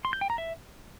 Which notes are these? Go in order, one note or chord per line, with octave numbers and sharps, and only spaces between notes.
C6
G6
G5
A#5
E5